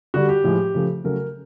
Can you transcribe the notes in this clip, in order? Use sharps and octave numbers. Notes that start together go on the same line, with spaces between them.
D3 G3 F#4
G4
A2 F3 G#3
C#3 F3 A3
C#3 F#3 A3 A#4